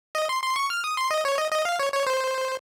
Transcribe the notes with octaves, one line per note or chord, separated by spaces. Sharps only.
D#5
C6
C6
C#6
F6
D#6
C6
D#5
C#5
D#5
D#5
F5
C#5
C#5
C5